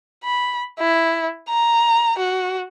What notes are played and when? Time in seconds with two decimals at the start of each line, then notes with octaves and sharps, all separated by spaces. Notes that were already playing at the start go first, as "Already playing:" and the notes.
0.24 B5
0.79 E4
1.49 A#5
2.18 F#4